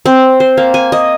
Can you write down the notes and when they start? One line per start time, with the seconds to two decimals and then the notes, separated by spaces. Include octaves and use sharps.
0.06 C4
0.40 C5
0.57 A#3
0.74 G#5
0.92 D#5